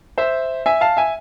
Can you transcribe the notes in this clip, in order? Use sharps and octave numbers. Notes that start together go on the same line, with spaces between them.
C5 E5
E5 G#5
F5 A5
E5 G#5